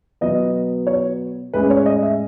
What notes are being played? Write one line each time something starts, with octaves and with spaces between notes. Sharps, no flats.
B2 F#3 B3 D#5
C#5
A2 G#3 C#4 B4
C#5
D#5
E5